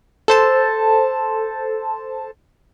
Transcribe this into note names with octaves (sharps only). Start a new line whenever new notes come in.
A4 C5 A5